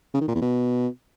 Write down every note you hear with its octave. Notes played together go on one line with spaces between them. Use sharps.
C#3
D#3
A#2
E2
B2